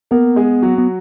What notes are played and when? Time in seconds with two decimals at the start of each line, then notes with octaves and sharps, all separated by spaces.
0.11 A#3 B3 A#4
0.36 G#3 G#4
0.62 F#3 F#4
0.78 B3